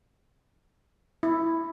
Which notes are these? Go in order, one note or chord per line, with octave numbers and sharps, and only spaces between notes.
E4